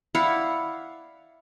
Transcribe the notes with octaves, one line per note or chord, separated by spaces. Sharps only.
E4 D5 F5 F#5